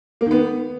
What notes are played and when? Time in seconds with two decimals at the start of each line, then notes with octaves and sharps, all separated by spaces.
0.21 A#3
0.26 D#3
0.31 B3